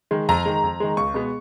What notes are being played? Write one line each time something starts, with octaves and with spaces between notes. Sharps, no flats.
D#3 G#3
F2 A#5
D#3 G#3
F2
D#3 G#3
C#2 C#6
B2 G#3 B3